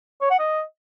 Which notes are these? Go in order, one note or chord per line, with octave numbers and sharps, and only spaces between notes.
C#5
F#5
D#5